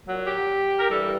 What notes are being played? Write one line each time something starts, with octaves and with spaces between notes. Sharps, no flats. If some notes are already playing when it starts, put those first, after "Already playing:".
A#2 F#3
G4
A#4
G2 E3 G3 A4